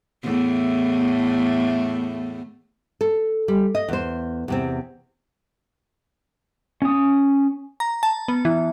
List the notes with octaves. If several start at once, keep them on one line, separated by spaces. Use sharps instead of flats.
E2 A2 A3
A4
G3
D#5
E2 C5
E2 C3 C4
C#4 D#6
A#5
A5
B3
E3